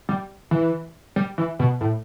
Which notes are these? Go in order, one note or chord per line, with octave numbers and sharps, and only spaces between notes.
G3
E3
G3
E3
B2
A2